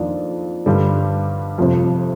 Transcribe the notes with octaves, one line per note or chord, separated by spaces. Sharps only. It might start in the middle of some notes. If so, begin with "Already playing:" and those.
Already playing: F2 D#3 A#3 D4 F4
G2 D3 G3
F2 C3 F3